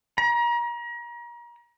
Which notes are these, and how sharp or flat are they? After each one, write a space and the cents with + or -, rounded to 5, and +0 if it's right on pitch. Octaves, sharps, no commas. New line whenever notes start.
A#5 +35